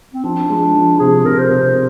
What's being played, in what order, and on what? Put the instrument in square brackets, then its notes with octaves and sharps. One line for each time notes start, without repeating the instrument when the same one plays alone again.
[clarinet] C4
[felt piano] F3 [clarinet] D4
[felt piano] G#3
F3
[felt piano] C3 [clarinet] G#4
[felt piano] C3 [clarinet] A#4
[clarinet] C5
[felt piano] C3